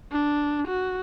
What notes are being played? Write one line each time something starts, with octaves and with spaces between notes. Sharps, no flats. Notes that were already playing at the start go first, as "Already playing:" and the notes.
D4
F#4